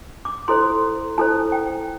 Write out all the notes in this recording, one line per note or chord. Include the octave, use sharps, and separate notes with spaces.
D6
E4 A4 C5 C6
E4 A4 C5 A5
G5